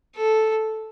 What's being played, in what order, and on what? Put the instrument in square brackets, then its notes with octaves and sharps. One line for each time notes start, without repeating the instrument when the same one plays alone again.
[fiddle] A4